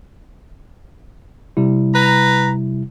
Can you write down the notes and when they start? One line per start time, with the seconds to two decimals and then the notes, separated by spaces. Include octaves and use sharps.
1.57 C3 G3 E4
1.94 B4 A#5